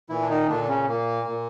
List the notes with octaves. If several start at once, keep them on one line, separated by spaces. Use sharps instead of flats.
A#2 E3 E4
D4
D#3 D#4
A#2 D3 D4
D4
C#3 C#4
A#2 A#3
A#2